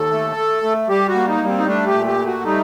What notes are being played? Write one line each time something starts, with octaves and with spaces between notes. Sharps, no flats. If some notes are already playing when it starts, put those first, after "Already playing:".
Already playing: D#2 A4
A3
A3
A3
G3 G4
F#4
A#3
D#4
G3
C4
D#4
A3 D4
G4
A#2
G4
A3
F#4
G3 D#4